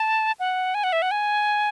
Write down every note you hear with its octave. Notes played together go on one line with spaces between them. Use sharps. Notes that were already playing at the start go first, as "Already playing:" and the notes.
Already playing: A5
F#5
G#5
F#5
E5
F#5
G#5